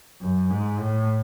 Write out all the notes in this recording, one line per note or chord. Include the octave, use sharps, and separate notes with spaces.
F#2
G#2
A2